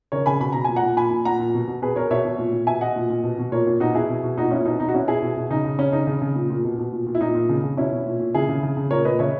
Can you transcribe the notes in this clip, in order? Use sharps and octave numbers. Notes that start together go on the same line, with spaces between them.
C#3 A#4 C#5
C#3 G#5 B5
B2 B5
B2 A#5
A#2 G#5
F#5 A#5
A#2
A#2 G#5 B5
A#2
A#2 F#5 A#5
A#2
B2
B2
B2 G#4 B4
B2 A#4 C#5
B2 C#5 E5
B2
A#2
A#2
B2 E5 G#5
B2 D#5 F#5
A#2
A#2
B2
B2
A#2 A#4 C#5
A#2
B2 D#4 F#4
B2 E4 G#4
B2
B2
A#2 D#4 F#4
A#2 C#4 E4
B2 D#4
B2 D#4
F#4
B2 C#4 E4
B2 E4 G#4
B2
B2
C#3 D#4
C#3
C#3 C#4
C#3 D#4
C#3
C#3
A#2
A#2
B2
B2
A#2
A#2
E4
A#2 D#4
A#2
C#3
C#3
B2 C#4 E4
B2
A#2
A#2
C#3 E4 G#4
C#3
C#3
C#3
A#2 A#4 C#5
A#2 B4 D#5
C#3 C#5 E5